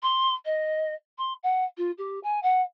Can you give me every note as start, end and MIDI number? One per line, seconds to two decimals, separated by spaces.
0.03 0.34 84
0.45 0.94 75
1.18 1.33 84
1.43 1.65 78
1.77 1.91 65
1.98 2.19 67
2.23 2.41 80
2.43 2.62 78